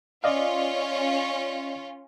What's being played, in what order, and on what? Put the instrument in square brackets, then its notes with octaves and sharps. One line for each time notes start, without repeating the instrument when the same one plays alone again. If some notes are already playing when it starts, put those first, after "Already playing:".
[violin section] C#4 F4 [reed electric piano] D5 D#5 F5